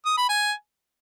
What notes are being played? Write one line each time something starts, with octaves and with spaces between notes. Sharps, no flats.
D#6
B5
G#5